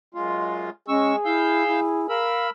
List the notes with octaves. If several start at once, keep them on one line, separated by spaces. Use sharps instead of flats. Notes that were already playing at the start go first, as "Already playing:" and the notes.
F#2 G#3 F4
G#3 C#4 G#4 C#6 E6
E4 F5 E6 G6
E4
A#4 F5 B5 E6